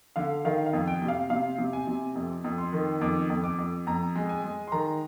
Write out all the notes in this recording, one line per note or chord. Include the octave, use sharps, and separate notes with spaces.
D3 F5
D#3 F5
F5
F2
G5
C3
F5
C3 F5
C3
G#5
C3
F2
F2
C6
D#3
F2 D6
F2
D6
F2
F2 A#5
G#3
G#5
G#3
C6
D#3 A#5